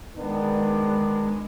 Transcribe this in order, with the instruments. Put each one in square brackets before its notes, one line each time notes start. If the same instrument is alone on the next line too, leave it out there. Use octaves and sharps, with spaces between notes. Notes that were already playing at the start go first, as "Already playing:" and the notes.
[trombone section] D#3 B3 D4 [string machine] G#3